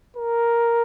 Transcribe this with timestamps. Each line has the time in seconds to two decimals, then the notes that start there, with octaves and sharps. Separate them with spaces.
0.16 A#4